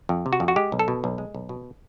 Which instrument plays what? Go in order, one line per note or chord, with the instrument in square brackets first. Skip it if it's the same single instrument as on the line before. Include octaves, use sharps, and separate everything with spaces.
[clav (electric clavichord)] F2
C3
F#4
F2
F#4
G#3 G4
B1
A4
B2
B1
G#3
B1
B2